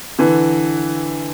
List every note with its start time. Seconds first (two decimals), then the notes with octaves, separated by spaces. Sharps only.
0.19 D3 E3